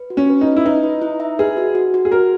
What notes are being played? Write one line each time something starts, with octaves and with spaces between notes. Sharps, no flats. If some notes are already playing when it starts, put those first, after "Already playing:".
Already playing: B4
F#4
C#4
B4
D#4
B4
E4
D#4 B4
B4
E4
E5
G#4 B4
F#4
F#4
F#4
G#4
F#4 A#4